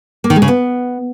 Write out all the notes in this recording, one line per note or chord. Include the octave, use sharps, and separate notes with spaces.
A#3
D#3
G#3
C#3
B3